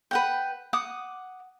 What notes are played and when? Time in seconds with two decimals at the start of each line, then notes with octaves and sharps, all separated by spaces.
0.11 B4 F#5 G5
0.73 F#5 D6 D#6